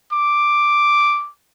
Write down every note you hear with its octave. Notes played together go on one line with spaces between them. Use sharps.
D6